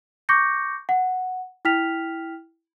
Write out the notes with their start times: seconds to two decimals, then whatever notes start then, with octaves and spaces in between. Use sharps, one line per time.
0.29 C#6 D6 G6 A#6 C#7
0.89 F#5
1.65 E4 G5 F6 B6 F7